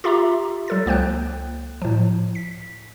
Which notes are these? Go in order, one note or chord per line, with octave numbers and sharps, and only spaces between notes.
F4 G4 E5 A#5 C6 D6
F#3 A4 A6
C#2 A#3 C5 G5 F#6
A2 F3
B6